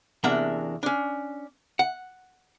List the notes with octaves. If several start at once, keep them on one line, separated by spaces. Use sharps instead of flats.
E2 C3 A#3 D4 E5 F#5
C#4 D4
F#5